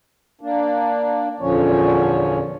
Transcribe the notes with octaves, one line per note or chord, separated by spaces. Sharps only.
A#3 D4
E2 A#2 D3 F3 C#4 C#5